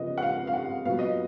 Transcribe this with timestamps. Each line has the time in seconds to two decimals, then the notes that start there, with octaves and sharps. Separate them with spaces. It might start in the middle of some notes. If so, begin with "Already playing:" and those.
Already playing: C#3 F3 B3 D#5
0.18 F#5
0.22 F5
0.47 F5
0.53 F#5
0.85 A#2 F#3 B3 F5
0.99 D#5